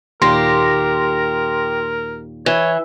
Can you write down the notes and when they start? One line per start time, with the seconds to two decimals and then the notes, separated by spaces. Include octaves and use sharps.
0.22 D#2 A#2 A#3 G4 A#4 C6 A#6
2.46 E3 C#5